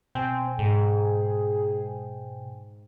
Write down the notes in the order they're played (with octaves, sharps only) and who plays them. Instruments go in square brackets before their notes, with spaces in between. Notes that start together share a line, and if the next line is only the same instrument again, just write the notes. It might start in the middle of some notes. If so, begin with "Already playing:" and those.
[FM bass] B2 [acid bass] C4 [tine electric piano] G5 G#5
[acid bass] G#2 [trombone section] G#4